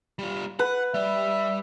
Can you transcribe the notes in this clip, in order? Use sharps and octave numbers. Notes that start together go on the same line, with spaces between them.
G3 F4
B4 F#5
G3 E5